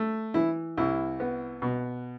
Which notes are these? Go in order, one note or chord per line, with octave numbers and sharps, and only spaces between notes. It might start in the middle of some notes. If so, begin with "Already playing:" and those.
Already playing: A3
E3 E4
C2 E4
B3
B2